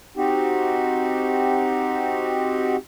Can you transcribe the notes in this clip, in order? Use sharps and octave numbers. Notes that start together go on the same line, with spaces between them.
C4 D#4 F#4 G4